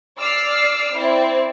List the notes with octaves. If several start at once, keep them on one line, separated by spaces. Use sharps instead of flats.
D5 D6 E6 F6 C7
C4 E4 D5